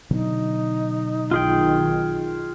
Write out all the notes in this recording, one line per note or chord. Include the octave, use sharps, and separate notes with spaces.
B2 D3 F#3 D#4
B1 D#3 F4 G#4 G5